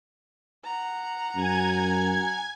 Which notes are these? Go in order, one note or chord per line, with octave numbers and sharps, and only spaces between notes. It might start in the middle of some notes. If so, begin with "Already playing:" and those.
F#5 A#5
F#2 G#5 G#6